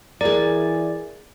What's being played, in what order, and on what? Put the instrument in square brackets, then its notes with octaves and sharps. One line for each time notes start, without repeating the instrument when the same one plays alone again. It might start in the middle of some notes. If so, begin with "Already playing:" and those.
[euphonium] E3 [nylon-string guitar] G#4 A#4 [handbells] D5